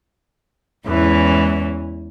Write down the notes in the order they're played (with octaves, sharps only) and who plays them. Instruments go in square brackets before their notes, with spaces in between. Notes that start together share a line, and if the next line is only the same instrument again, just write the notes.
[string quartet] E2 G#2 E3 C#4